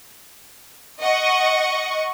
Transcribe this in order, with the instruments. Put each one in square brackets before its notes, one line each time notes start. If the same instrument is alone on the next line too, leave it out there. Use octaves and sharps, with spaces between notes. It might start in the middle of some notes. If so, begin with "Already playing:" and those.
[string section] D#5 F#5 C#6